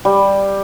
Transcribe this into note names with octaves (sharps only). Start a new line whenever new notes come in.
G3